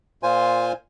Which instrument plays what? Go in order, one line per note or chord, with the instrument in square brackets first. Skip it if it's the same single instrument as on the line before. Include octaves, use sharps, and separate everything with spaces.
[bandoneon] A#2 F4 C5 G#5